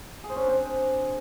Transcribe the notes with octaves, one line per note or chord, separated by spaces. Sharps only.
G#4
C5
C#4
D4
C4